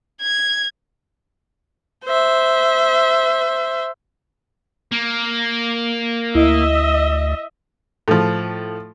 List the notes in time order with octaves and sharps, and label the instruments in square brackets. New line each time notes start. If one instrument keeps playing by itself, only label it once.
[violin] G#6
[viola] C5 E5
[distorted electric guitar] A#3
[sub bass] D2 [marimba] E4 [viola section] D#5 E5
[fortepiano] A2 F3